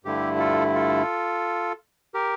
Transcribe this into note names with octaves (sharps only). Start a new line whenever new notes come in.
G2 D3 A3 E4 G4
F4 A4
F4 A4
G4 A#4